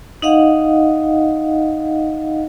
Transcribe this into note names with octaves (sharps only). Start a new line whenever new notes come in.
D#4 D#5 F5 F#5